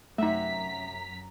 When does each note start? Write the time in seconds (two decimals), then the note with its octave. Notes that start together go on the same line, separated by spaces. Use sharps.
0.18 F#2 C3 A3 D#4 F#4 E5 A#5 B6